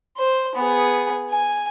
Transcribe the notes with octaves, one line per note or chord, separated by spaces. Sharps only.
C5
B3 G#4
G#5